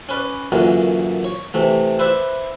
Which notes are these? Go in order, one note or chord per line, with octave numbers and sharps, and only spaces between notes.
C#4 B4 D5
F#2 A#2 D3 E3
C#5
C3 E3 A3
E4 B4 C5 D5 E5